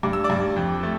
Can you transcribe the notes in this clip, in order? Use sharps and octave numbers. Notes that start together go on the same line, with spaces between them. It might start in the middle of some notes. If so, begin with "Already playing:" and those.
G2 D6
E6
D5 D6
G2
F2
A3